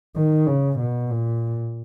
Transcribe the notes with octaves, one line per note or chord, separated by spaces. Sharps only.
D#3
C#3
B2
A#2